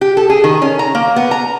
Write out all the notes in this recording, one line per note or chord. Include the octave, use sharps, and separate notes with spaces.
G4
A4
G#4
D#3
C#4
A#5
A#3
B3
A#5